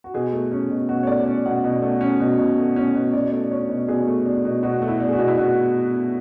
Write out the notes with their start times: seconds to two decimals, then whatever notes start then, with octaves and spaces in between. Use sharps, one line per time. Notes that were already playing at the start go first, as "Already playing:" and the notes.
0.04 F#4
0.14 B2 G#4
0.33 A3
0.51 C#4
0.70 B2
0.88 B2 F#4
1.03 C#5
1.07 A3 D5
1.26 C#4
1.46 B2 F#5
1.64 B2
1.82 A3
2.01 C#4
2.20 B2
2.38 B2
2.58 A3
2.76 C#4
2.95 B2
3.13 B2 D5
3.32 A3
3.50 D4 C#5
3.69 B2
3.88 B2 G#4
4.07 A3
4.26 D4
4.45 B2
4.63 B2 F#4
4.79 A3 F#4
4.88 E4
5.00 D4
5.08 G#4
5.13 F#4
5.19 B2
5.28 E4
5.38 B2 F#4